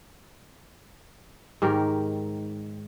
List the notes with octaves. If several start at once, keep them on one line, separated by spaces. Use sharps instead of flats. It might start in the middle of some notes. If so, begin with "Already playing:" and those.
G#2 D#3 G4 A#4